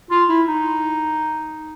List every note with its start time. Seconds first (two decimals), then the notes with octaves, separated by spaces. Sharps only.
0.11 F4
0.29 E4
0.48 D#4